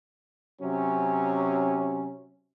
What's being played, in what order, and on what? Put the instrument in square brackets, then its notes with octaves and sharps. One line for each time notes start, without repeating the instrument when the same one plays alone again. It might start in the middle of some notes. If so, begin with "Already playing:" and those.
[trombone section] C3 F#3 C#4